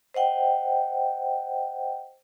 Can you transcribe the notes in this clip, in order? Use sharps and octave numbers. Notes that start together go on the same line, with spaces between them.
C5 D#5 F#5 G5